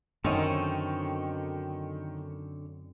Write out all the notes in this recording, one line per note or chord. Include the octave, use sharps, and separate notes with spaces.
F#2 D3 D#3 C4 C#4 D#4 A4 C#5